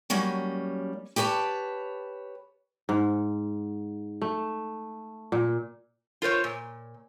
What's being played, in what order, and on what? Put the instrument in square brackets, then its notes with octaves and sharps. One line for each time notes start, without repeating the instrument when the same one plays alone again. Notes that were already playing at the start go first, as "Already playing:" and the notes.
[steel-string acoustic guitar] F#3 G3 A#3 C#4
G4 B4 C#5 G#5 A5
[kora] G#2
A3
A#2
[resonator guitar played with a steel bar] F4 A#4 C5 C#5
A#2